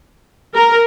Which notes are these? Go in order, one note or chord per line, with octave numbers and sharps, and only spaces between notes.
A#4